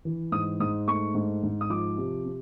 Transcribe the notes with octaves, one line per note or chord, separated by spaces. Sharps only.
E3
G#2 D#6
G#2 D#6
A3 C#6
G#2
G#2
D#6
F3 D6
C3
C3